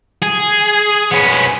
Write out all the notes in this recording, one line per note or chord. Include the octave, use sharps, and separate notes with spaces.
G#4
B3 C#4